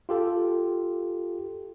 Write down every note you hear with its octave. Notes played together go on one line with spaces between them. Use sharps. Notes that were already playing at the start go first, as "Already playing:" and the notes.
F4 G4 A4